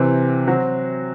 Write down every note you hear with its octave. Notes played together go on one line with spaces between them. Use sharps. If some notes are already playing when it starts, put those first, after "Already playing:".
Already playing: C3 E3 C4
F#3 C4 F#4